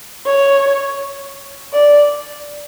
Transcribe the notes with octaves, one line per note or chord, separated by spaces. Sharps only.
C#5
D5